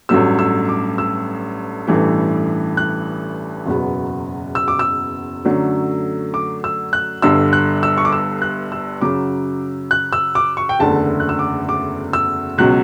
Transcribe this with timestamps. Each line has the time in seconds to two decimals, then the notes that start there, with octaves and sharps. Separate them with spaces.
0.09 A1 G2 F#3 A3 E6
0.39 E6
0.69 D6
0.98 E6
1.87 A1 G2 E3 A3
2.77 F#6
3.66 F#1 E2 B2 F#3 B3
4.55 E6
4.68 D6
4.79 E6
5.45 F#2 D3 F#3 A3
6.34 D6
6.64 E6
6.93 F#6
7.22 G1 G2 D3 E6
7.53 F#6
7.83 E6
7.98 C#6
8.05 D6
8.12 E6
8.42 F#6
8.72 E6
9.01 F#2 C#3 F#3 D6
9.91 F#6
10.13 E6
10.35 D6
10.57 C#6
10.69 G5
10.79 F#1 E2 D3 A3 A5
11.20 F#6
11.29 E6
11.39 D6
11.69 D6
12.13 E6
12.58 C#2 B2 F#3 F#6